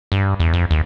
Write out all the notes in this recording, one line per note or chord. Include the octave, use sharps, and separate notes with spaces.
G2
E2
F2
D#2